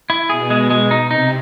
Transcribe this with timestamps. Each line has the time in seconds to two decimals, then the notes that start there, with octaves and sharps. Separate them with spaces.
0.10 E4
0.30 B2 G#4
0.50 G#3
0.70 G#3
0.91 D#4
1.10 C3 D#4